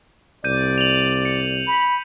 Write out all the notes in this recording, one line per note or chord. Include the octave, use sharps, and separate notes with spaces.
C2 D5 G6 D#7
F7 F#7
C#7
B5